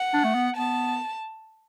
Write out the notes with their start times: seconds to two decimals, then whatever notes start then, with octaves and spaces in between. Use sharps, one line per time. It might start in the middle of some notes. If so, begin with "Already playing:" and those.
Already playing: F#5
0.14 D4
0.24 A3
0.35 B3
0.56 B3 A5